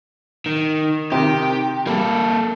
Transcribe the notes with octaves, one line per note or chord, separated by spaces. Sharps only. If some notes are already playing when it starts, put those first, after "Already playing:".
D#3
C3 D#3 G4
G3 A#3 A4